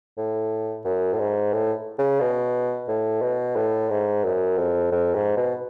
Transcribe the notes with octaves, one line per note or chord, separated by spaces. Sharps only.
A2
F#2
A2
G#2
A2
C#3
B2
A2
B2
A2
G#2
F#2
F2
F2
G#2
B2